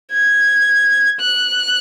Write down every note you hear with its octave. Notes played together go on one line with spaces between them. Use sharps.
G#6
F#6